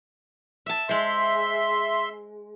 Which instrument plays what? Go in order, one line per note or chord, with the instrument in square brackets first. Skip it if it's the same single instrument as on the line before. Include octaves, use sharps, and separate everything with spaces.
[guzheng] E5 A5
[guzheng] G#3 C5 [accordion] E5 C6